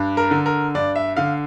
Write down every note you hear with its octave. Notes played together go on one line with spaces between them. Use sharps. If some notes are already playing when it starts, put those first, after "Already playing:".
Already playing: G2
A#4
D3
A#4
G2 D5
E5
D3 F5